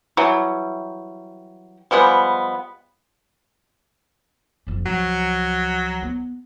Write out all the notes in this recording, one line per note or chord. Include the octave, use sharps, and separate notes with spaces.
E3 F#3 G3
F3 G3 G#3 B3
F#1 F2
C#2 F3 F#3
B3